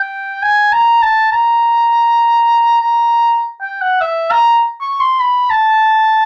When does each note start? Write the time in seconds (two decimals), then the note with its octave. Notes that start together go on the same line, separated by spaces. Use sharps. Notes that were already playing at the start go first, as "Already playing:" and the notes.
Already playing: G5
0.43 G#5
0.72 A#5
1.02 A5
1.32 A#5
2.81 A#5
3.61 G5
3.81 F#5
4.01 E5
4.31 A#5
4.81 C#6
5.00 C6
5.20 B5
5.50 A5